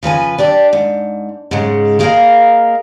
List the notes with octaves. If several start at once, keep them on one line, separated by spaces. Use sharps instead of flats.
C#3 F3 B4 G#5
D4 G4 D5
G#2
G#2 C#3 G#3
A#3 G#4 A#4 C5 D#5 F5